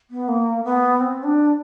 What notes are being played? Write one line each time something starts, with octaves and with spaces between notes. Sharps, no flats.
B3
A#3
B3
C4
D4